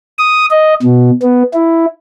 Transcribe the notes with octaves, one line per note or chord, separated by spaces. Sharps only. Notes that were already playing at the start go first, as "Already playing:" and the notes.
D#6
D#5
B2
B3
E4